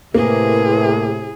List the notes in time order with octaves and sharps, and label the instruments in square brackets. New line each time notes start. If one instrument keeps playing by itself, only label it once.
[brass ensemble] A2 C3 [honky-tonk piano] A#3 [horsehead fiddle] E4 G#4 [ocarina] B4